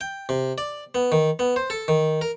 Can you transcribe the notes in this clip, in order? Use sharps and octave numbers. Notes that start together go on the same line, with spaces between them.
G5
C3
D5
B3
D#3
B3
C5
A4
D#3
A#4